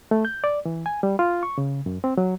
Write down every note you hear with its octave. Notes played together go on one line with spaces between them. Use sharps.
A3
G6
D5
E3
G#5
G3
F4
C#6
C#3
F#2
C4
F#3